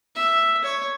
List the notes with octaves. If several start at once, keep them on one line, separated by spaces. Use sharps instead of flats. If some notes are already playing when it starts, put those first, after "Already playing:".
E5
C#5